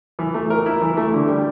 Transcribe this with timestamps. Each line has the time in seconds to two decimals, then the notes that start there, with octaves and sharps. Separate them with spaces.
0.19 E3
0.34 A3
0.50 A#4
0.66 E4
0.82 E3
0.97 A3
1.13 D3
1.28 G3